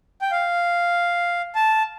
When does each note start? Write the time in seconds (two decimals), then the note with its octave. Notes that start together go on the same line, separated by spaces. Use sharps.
0.21 G5
0.31 F5
1.55 A5